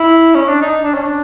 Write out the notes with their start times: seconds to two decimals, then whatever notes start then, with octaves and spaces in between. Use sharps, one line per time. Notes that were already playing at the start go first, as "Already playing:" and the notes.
Already playing: E4
0.35 C#4
0.48 D4
0.61 D#4
0.83 D4
0.94 C#4
1.04 D4